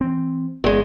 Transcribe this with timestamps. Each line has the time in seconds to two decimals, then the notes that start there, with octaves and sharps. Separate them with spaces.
0.01 E3 C4
0.64 G1 E2 G#3